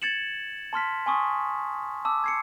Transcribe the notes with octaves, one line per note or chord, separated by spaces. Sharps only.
G#6 A6 C#7 E7 F#7
A5 C6 F6 B6
G#5 C6 C#6 D#6
A5 D6 E6
G#6 C7 C#7